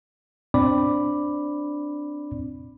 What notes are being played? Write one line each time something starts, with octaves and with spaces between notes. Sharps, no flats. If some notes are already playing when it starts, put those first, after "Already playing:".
C4 D4 D5 B5 D6